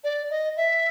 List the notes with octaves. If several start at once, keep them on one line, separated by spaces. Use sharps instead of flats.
D5
D#5
E5